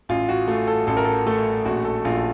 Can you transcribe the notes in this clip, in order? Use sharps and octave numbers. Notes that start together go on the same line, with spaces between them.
A1 F4
F#4
A3 F4
A4
A1 A4
A#4
A4
A3 A4
A#1 F#4
A4
A#1 F4